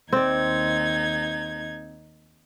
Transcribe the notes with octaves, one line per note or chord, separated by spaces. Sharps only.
D#2 C4 D#4 D5 G#6